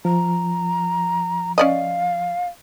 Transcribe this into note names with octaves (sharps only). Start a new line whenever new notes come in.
F3 A#5
C#4 D5 D#5 F5